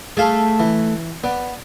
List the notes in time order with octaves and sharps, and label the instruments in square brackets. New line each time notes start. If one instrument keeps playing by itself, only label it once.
[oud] A3 A4 [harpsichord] G#4 F5
[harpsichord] E3
[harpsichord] B3 [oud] D5